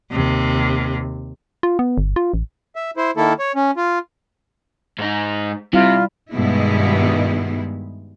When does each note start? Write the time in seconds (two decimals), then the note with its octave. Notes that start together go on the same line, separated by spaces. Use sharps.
0.12 D#2 C3
1.63 F4
1.79 B3
1.98 G1
2.16 F4
2.34 A1
2.76 E5
2.97 E4 C5
3.17 D#3 A#3 E4 A4
3.39 C#5
3.55 C#4
3.77 F4
4.99 G#2 D#4
5.73 C3 G3 E4 F4
6.33 G2 B2 D#3 G#3 B3 E4